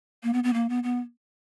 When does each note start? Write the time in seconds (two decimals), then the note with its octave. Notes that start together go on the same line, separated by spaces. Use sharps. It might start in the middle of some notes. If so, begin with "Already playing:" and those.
0.23 A#3
0.33 B3
0.44 B3
0.54 A#3
0.69 B3
0.83 B3